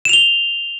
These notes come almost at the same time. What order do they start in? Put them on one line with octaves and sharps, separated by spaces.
E7 F7 G7